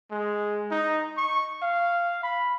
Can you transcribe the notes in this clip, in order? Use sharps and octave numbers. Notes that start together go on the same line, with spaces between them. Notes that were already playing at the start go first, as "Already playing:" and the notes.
G#3
D#4
C#6
F5
B5